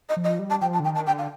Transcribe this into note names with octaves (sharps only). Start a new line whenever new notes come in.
D#5
F3
D#5
G3
A5
F3 G5
A5
D3
D#3 G5
A5
D3 G5
F5